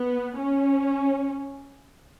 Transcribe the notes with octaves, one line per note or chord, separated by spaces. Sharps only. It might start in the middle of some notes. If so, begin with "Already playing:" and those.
Already playing: B3
C#4